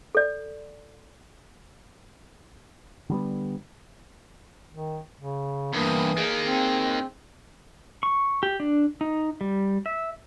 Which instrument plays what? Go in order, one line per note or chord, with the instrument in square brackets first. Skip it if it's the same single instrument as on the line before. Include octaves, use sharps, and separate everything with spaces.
[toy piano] A4 D5
[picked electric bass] D3 G3 B3
[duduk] D#3
C#3
[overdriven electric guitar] E2 G2 [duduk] E3 [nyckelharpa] A#3 D#6
[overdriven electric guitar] D#3 A#3 [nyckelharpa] G#4
[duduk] C4
[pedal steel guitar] C#6
G4
D4
D#4
G3
E5